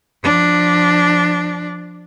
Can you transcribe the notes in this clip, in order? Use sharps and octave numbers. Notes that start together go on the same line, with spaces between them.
F3 D4